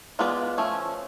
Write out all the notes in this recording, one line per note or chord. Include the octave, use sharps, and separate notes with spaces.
G#3 B3 F4 B4 D5
F3 A3 C#4